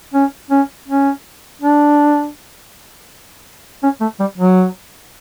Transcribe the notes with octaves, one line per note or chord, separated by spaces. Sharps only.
C#4
C#4
C#4
D4
C#4
A3
G3
F#3